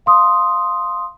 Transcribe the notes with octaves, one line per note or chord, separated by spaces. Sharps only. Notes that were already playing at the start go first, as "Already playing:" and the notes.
F5 C6 D#6